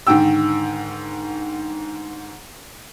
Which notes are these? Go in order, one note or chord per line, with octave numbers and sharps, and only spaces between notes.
G#2 D3 D#3 G5 E6